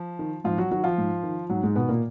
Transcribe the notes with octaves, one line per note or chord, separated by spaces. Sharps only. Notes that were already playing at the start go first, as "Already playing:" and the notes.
Already playing: F3
D#3
G#2 F3 F4
F#3 F#4
D#3 F#3 F#4
F3 F4
G#2
D#3
G#2 F#3
G#2 G#3
B2 D#3 B3
A#2 A#3